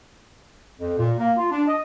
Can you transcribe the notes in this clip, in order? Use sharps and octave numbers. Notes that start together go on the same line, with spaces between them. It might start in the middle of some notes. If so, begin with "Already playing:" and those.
F2
A#2
A#3
F4
D4
D#5